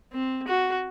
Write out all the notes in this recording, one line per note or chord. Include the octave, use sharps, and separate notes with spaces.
C4
F#4